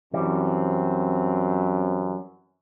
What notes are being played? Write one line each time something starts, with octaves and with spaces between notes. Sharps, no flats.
F#2 E3 G3 C4